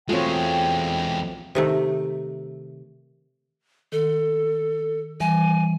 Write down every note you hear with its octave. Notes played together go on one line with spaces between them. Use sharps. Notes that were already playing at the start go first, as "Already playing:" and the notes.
E2 G#3 A3 C4 F4 F#4 C#5 G5
C3 D#3 A3
D#3 A4
E3 G3 G#5